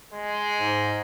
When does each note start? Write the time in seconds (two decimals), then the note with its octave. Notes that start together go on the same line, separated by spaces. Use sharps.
0.14 G#3
0.59 G#2